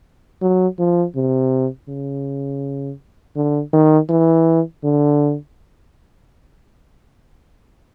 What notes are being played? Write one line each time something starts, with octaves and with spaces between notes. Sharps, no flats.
F#3
F3
C3
C#3
D3
D#3
E3
D3